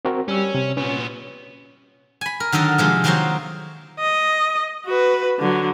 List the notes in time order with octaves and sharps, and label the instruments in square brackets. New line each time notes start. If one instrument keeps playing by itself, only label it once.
[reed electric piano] C4 F#4 A#4
[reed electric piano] G3 E6 [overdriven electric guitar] C#4
[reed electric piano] C3
[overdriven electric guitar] A#2 B3 [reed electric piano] C#4
[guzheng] G#5 B5
A#4
D3 D#3 F#3 A4 A#4
C3 F3 G#3 C6
D#3 F#3 A#3 F4 F#4 C5
[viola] D#5
F#4 B4
D3 F#3